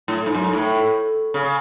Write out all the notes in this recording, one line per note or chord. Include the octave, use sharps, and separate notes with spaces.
A2
G#2
F#2
G#2
A2
C#3